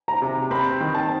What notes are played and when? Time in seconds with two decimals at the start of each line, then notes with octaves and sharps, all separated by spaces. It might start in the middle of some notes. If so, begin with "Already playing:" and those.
0.08 A#5
0.22 C3
0.51 C4 B5
0.80 D#3
0.94 A5